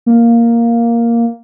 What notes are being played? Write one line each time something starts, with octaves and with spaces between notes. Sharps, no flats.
A#3